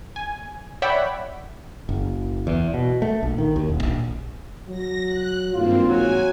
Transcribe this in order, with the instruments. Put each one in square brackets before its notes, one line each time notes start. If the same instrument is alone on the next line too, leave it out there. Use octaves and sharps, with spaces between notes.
[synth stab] G#5
C#5 D5 E5 F#5 G5 B5
[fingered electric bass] F#1
E2
B2
A3
A#1
D#3
D#2
D#1
A#1
[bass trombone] F#3 [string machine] A#6
[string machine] F#6
[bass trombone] G#1 [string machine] G2 A#3 C4 [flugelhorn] F4
[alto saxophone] F#3 [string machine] G#5